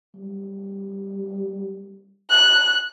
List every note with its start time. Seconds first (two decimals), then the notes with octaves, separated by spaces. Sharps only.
0.16 G3
2.30 F#6